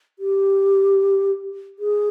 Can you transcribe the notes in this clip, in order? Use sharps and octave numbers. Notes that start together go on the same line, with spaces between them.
G4
G#4